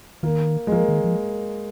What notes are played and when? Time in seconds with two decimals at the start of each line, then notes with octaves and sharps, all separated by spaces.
0.23 D#3 A#3
0.67 G#3
0.72 F3 A#3
0.88 D#3
1.04 F3